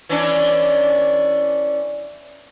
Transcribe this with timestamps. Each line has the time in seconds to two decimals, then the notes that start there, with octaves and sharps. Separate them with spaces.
0.09 E3 C#4 D4